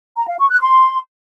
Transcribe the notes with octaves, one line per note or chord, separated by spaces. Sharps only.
A#5
F5
C#6
F#6
C6